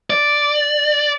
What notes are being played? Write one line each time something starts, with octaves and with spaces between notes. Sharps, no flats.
D5